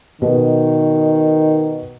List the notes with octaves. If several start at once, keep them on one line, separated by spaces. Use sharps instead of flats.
B2 D#3